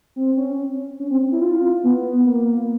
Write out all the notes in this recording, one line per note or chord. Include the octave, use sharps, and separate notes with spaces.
C4
C#4
C#4
C4
E4
F4
B3
A#3